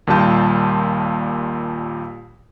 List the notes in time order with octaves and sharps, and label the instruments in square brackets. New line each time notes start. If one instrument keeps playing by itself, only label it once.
[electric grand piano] D#2 A#2 G3 F4 A5 G6